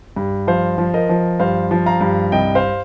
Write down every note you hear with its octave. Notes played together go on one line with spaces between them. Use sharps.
G2
F3 C5 F5
F3
A#4 D#5
F3
G2 C5 F5
F3
F5 A#5
G2
C2 D#5 G5
C5 F5